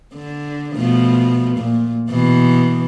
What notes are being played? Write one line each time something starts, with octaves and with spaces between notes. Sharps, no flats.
D3
B2 F3 A3
A#2
B2 E3